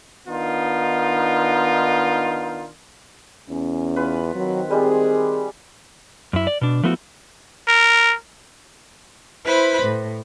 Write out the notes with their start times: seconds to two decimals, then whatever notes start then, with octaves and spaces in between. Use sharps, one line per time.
0.28 D#3 B3 D4 D#4 F4
3.50 E2 C#4
3.96 F4 B4
4.35 D#3 F#3 C4
4.71 G3 G#3 F4 G#4
6.33 F#2 E4
6.47 D5
6.61 B2 D4
6.83 F3 A3 B3 E4 F#4
7.68 A#4
9.45 E4 B4 C5 B5
9.82 A2